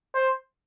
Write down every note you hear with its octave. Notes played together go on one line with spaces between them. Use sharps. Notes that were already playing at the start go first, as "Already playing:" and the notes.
C5